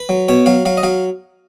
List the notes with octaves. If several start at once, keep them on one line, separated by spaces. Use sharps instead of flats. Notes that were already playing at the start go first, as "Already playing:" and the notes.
Already playing: B4
F#3
B2 C#5
F#3 F5
F#3 F5
D#5
F#3 F5